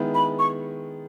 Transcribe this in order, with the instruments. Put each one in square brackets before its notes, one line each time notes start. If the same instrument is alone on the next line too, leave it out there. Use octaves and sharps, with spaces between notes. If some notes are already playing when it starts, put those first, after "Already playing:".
Already playing: [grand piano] D#3 G#3 B3 E4
[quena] B5
C#6